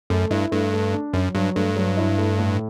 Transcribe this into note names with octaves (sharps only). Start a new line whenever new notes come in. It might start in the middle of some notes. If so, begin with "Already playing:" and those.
F#2 A3
G2 E4
G2 A3
A3
D4
F#2 F#3
G2 F#3
G2 A3
F#3
E4
A3
A2